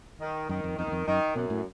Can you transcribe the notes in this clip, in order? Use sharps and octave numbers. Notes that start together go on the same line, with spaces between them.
D#3
F#2 D#3
F2
F2 D#3
E2
F2
F#2 D#3
F#2 B2
A2